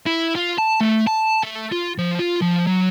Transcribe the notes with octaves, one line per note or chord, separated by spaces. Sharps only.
E4
F4
A5
A3
A5
A3
F4
F3
F4
F3
F#3